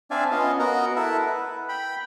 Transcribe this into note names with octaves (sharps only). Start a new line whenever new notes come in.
C4 D4 D5 E5 F5 G#5
B3 C#4 F4 D#5 F5
B3 F#4 A#4 D#5 F#5 A#5
E4 A4 A#4 E5 F#5
B4
G5 B5